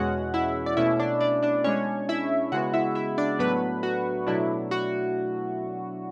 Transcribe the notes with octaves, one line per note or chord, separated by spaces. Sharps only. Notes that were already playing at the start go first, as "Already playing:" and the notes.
Already playing: E2 B2 G#3 C#4 F#4 F#5
E4 E5
D5
B2 A3 C#4 E4 E5
D4 D5
D4 D5
D4 D5
B2 G#3 C#4 D4 C#5
E4 E5
C#3 G#3 B3 F#4 F#5
E4 E5
E4 E5
D4 D5
A2 F#3 A3 B3 D4 B4
F#4
B2 F#3 A3 D4 E4
F#4